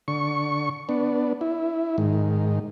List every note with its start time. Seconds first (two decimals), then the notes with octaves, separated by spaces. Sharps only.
0.08 D3 C#6
0.89 B3 D4
1.41 E4
1.98 G#2 D#3